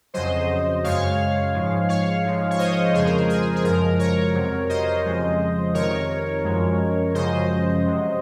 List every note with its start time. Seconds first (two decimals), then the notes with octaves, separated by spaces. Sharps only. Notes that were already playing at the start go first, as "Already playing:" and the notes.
0.14 F2 C#3 F#3 C5 D#5
0.84 F#2 C#3 G#3 C#5 F5
1.54 G#2 F3 G#3
1.89 C#5 F5
2.25 G#2 F3 G#3
2.51 C#5
2.59 C5 D#5
2.94 F2 C#3 F3 G#3 G#4 C5
3.06 A#4
3.17 G#4
3.30 G#4
3.56 G#4
3.64 F#2 C#3 F3 G#3 A#4
3.99 A#4 C#5
4.34 F2 C3 F#3
4.69 C5 D#5
5.05 F2 C#3 F3 G#3
5.74 F2 C3 D#3 A#4 C#5
6.44 F#2 F3 G#3
7.14 F#2 C#3 F3 G#3 C5 D#5
7.85 C3 F#3